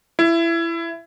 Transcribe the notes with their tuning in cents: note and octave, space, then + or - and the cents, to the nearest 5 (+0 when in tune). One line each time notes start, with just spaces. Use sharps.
E4 +20